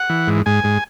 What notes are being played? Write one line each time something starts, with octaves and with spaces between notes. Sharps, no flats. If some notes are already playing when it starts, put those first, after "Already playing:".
Already playing: F#5
E3
G#2
G#2 G#5
G#2